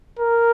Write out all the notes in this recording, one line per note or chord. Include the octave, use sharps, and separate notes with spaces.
A#4